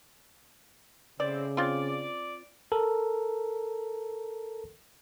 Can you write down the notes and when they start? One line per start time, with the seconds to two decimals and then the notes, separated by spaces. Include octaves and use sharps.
1.20 A2 C#3 C4 D5
1.57 C4 F4 D5
2.72 A4 A#4